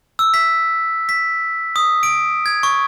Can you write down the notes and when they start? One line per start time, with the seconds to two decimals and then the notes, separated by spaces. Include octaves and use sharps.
0.19 E6
0.34 B6
1.09 B6
1.76 D#6
2.03 D7
2.46 G#6
2.63 C#6